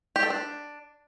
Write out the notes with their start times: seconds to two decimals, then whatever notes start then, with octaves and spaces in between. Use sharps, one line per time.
0.16 G4
0.23 A4
0.30 D4